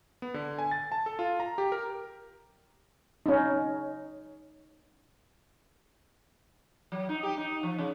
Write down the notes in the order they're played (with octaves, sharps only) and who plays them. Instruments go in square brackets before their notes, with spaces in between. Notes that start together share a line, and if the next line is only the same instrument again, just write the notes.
[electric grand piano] B3
D3
G#5
A6
A5
A4
F4
A#5
G4
A#4
[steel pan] C#4 D#4
[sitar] F#3
D#4
G4
D#4
F3
C#3